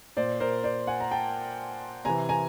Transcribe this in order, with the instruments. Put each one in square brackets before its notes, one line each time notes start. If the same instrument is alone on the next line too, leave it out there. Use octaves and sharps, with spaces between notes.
[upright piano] A#2 C5 D5
A#4 C5
C5 D5
F#5 G#5
A#5
G5 A5
C3 E3 G#5 A#5
G#5 A#5